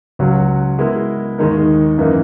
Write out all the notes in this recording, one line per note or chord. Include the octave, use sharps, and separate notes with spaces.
C#2 C#3 F#3 C#4 F#4
G#3 B3 E4 A#4
D#2 D#3 G#3 D#4 A#4
F#2 E3 A#3 D#4